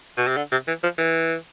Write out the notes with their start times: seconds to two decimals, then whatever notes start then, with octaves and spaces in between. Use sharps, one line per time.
0.17 B2
0.27 C3
0.37 D3
0.52 C3
0.68 E3
0.83 F3
0.98 E3